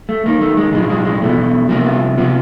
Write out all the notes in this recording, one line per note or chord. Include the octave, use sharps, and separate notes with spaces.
A3
D#2 D#3 A#3
A3
G#3
B1 A2 F3 G#3
G#3
G#3
E2 B2 A3
C2 C3 F3 A#3
B3
C3 F3 B3